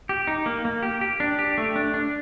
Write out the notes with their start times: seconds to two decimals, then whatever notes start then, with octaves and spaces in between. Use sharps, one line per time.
0.09 G4
0.27 D#4
0.46 A#3
0.65 A#3
0.82 G4
1.01 G4
1.20 D4
1.39 G4
1.58 A3
1.76 D4
1.94 D4